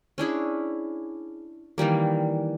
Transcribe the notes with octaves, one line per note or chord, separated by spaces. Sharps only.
C#4 D4 E4 G#4
D#3 E3 G3 A#3